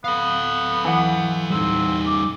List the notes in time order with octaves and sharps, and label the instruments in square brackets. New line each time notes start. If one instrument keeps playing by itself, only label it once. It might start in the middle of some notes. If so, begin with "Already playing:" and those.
[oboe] B3 [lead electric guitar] A4 F5
[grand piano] E3 F#5
[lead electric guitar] G3 D#4 [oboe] C4
[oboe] D6